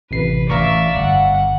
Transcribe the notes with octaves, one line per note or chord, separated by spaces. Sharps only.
A1 C3 B4 C7
A1 D5 E5 F5 A#5 C#6
G1 F#5